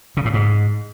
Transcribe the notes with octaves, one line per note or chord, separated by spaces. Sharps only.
C#3
A2
G#2